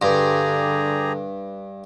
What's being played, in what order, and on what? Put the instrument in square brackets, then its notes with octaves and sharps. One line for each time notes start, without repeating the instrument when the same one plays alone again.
[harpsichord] G2 [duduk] D3 [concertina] G4 G#4 A#5